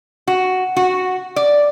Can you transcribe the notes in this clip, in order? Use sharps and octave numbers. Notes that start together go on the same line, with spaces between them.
F#4
F#4
D5